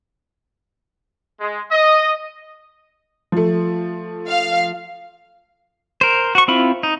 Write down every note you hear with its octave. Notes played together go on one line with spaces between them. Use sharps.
G#3
D#5
F3 A3
F5
A#4 C5
F#4 C#6
C4 E4 F4 B5
D#4